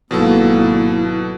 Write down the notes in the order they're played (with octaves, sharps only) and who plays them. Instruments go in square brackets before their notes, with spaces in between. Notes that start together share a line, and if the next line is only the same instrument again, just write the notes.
[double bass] G#1 [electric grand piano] B2 F#3 A4 [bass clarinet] A#3 [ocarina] E4